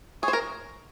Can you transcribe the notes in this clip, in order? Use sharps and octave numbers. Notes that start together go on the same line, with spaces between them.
G#4 C#5
C5
A#4